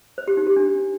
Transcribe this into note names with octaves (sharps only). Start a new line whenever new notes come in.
C5
G4
D#4
G4
D4